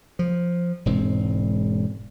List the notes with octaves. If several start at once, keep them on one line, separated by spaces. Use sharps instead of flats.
F3
E1 G#2 G3 C4